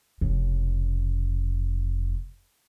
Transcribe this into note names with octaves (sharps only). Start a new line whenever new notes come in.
F1 C#3